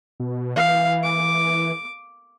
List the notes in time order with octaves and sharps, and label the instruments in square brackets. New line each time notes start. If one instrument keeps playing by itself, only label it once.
[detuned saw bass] B2
[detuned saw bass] E3 [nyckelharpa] F5
[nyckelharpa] D6